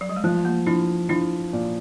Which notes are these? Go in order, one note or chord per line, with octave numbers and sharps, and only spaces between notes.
F#3
G3
G#3
F3 A3
A#3
F3 D4 E4
F3 D4 E4
A#2